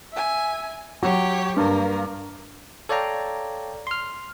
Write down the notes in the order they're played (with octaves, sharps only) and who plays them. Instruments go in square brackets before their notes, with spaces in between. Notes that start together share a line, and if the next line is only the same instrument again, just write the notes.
[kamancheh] E5 G#5
[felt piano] F#3 [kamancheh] G4 C#5
[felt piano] G2 [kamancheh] A#3 A#4
[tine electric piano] A4 C#5 D5 F5 G5 A#5
C6 F6